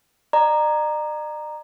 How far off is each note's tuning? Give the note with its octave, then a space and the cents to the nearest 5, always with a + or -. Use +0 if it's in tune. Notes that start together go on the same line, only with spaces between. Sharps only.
D5 +45 A#5 +0